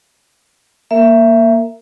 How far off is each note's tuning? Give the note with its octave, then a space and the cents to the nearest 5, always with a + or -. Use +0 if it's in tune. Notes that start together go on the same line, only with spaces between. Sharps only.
A#3 +0 A#4 -20 E5 +20